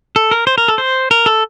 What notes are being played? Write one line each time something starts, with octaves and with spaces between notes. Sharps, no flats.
A4
A#4
C5
A#4
A4
C5
A#4
A4